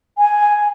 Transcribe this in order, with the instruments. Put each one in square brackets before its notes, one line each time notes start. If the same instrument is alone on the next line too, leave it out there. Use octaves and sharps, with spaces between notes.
[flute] G#5